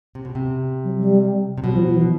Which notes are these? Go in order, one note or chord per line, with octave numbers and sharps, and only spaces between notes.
C3
B2
C3
F#3
G3
C3
B2 F#3
F3
F3
E3